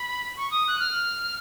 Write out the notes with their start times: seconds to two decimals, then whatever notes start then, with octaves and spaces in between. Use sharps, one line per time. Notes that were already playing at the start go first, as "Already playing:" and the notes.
Already playing: B5
0.37 C#6
0.51 D#6
0.68 F#6
0.80 F6